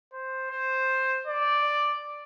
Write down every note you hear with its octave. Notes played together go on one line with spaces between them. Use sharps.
C5
C5
D5